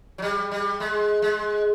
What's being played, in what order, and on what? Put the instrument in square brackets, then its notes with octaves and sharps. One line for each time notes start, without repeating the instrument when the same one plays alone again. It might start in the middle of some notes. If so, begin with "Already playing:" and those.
[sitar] F#3
G3
G3
G#3
G#3